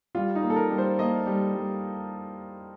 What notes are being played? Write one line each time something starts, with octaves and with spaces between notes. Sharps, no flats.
G3 F4
D#4
A#3
A4
A#4
G3
C5
A#3 D#5
G3
G3